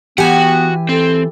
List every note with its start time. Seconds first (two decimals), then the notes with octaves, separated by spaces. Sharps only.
0.18 E3 B3 F#4 G4 F#5 G#5
0.89 C4 A4